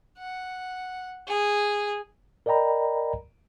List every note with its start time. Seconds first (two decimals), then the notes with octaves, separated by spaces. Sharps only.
0.18 F#5
1.27 G#4
2.46 A#4 D5 D#5 G5 A#5 B5